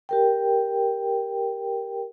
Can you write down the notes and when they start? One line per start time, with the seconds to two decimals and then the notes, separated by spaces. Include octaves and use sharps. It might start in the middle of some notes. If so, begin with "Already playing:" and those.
0.09 G4 A#4 G5